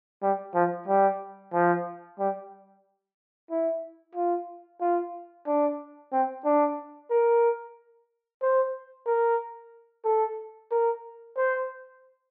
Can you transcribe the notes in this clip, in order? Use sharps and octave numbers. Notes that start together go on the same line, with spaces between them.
G3
F3
G3
F3
G3
E4
F4
F4
D4
C4
D4
A#4
C5
A#4
A4
A#4
C5